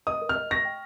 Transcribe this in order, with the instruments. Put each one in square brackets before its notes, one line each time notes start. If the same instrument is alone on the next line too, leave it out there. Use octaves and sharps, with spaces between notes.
[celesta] D#5 [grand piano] D#6
[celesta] A#4
[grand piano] F6
[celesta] D#5
[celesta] C#6 [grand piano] A#6
[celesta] G5